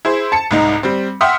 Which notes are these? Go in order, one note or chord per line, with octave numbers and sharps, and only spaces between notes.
E4 G#4 C5
A5 C#7
C2 G#2 D#4
G3 C4
E5 F#5 G5 C6 D#6 F6